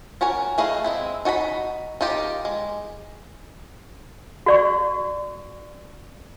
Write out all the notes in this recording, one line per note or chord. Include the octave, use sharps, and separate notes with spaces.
C#4 F#4 A#4 G#5
A3 G#4 B4 D#5 F5
G#3 C4 E4
D#4 F#4 G#5 B5
D#4 F4 G4 A#4
G#3
F#4 D5 C#6